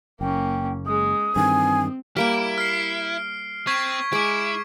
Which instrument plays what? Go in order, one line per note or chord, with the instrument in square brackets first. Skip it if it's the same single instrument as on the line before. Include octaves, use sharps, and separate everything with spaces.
[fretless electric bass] F#1 [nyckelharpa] A#3 C#4 [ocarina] G5
[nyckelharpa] G#3 G#4 [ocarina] D#6
[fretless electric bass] G2 D#3 E3 [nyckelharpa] C4 [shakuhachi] G#5
[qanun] G3 A#3 G5 [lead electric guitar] E4 [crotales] F6 D7
[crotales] F6 C7
[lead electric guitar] C4 [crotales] C#6 G#6 B6
[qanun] G#3 [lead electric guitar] E4 [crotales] D6 D7